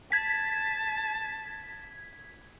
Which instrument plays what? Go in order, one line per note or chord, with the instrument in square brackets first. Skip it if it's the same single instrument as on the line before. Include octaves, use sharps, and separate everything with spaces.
[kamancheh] A5 [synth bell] G#6 B6